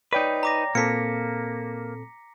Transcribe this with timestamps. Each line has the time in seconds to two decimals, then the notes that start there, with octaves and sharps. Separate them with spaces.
0.13 D#4 B4 C#5 D5 G5
0.43 A#5 D6 A#6
0.75 A#2 A#3 C4 A4 B6 C#7